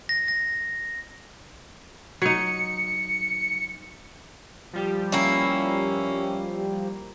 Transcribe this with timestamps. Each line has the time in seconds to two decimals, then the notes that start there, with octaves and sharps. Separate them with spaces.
0.09 A#6
0.28 A#6
2.22 F#3 D#4 C#7
4.73 F3 G3 G4
5.12 A#3 C#4 E4